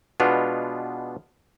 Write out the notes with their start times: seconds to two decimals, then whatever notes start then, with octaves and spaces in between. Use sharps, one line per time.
0.20 B2 G#3 B3 D4 F4